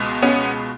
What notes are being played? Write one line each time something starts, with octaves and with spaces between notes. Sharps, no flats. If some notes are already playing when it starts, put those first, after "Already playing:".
Already playing: C#2 B2 G#3
B3 C#4